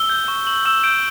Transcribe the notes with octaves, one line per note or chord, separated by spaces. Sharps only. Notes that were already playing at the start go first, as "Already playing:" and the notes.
Already playing: E6 G7
G6
C#6
C#6 F#7
E6 E7
G6 D7